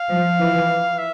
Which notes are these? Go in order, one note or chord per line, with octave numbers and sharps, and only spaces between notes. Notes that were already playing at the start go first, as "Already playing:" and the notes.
Already playing: F5
F3
E3
E5